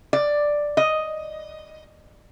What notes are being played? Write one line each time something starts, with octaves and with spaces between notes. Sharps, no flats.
D5
D#5